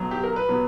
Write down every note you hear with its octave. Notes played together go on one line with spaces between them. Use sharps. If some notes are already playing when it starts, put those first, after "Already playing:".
Already playing: B1 B2 F#3
G4
A#4
B4
B2 F#3